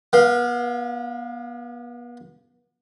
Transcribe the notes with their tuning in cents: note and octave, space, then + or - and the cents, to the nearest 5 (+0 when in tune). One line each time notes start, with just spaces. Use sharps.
B3 -35 F5 +0